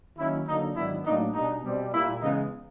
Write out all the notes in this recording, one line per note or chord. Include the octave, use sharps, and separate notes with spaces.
D#3 F#3 A#3 C#4 E4
D3 F#3 A#3 D#4
G#2 D#3 F#3 B3 D4 E4
A2 F#3 A#3 D4 D#4
B2 G3 B3 D4 D#4
B2 G3 C4
A#2 G3 A#3 E4
C#3 E3 G#3 B3 D#4